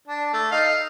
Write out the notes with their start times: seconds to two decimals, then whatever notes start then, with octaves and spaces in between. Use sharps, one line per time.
0.08 D4
0.33 A3
0.52 D#4 F5